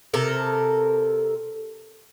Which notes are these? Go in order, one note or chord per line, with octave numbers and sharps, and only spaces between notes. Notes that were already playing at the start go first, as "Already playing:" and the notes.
C3 A4 A#4